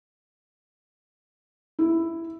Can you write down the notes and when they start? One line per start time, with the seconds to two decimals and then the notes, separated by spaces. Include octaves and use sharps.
1.79 E4